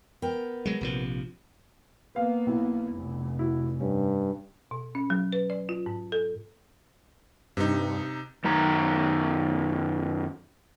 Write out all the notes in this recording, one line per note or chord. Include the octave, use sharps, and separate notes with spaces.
B3 A#4 G5
F#3 G#3
A#1 C3 F3
A#3 B3 B4 F5
B1 E4
F1
E4 F#4
G2 C#4
B2
C#4
F#3
B4
D5
F4
G#2
A4
G2 C3 D#4
F#2 D#3 A#5